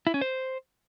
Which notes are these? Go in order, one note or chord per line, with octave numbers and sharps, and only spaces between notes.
E4
C#4
C5